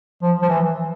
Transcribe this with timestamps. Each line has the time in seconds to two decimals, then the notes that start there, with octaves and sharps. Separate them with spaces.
0.22 F3
0.42 F3
0.49 E3